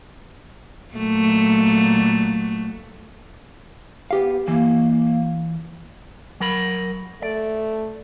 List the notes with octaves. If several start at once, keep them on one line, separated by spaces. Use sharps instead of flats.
A#2 F#3 A3
B3 G4 F5
E3 A#3
F#3 A#4 B5
A3 D5